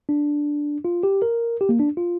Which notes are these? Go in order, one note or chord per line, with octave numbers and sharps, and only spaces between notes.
D4
F4
G4
A#4
G4
A#3
D4
F4